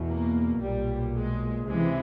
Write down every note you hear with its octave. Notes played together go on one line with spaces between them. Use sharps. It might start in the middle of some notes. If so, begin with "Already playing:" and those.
Already playing: E2 B2
A#3
B1 A#2 G3
G#3
C#2 C3 E3 G#3